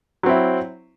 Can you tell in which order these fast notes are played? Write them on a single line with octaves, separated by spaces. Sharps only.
F#3 C4 E4